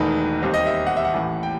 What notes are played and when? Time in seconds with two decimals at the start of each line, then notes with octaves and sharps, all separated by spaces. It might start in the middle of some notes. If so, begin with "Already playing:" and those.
Already playing: E1 E2 D#3 A3 D#4 B4
0.42 D#2 D#3 G3 C4 D#4
0.54 D#5
0.66 E5
0.87 F#5
0.97 E5
1.05 F#5
1.14 A1 A2 E3 A3
1.43 G5